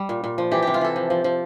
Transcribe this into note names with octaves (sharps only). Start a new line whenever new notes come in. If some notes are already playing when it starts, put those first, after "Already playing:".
Already playing: G3
A#2
A#2
F3
E3 G4
C3 G4
F4
E3 A4
F3
F3
F3